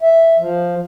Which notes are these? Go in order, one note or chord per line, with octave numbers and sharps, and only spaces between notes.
E5
F3